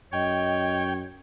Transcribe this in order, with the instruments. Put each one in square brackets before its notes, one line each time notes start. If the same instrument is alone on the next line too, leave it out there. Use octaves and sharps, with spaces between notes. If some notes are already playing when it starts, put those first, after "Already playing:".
[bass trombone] F#2 [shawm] C#5 [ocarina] D#5 [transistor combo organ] G5